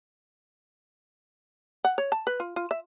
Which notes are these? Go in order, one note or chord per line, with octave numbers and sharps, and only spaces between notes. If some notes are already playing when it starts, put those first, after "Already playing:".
F#5
C#5
A5
B4
F4
F4
E5